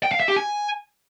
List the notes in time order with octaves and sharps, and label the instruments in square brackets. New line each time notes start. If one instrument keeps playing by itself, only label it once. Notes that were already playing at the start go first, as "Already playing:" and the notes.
[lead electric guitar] G5
F5
E5
G4
G#5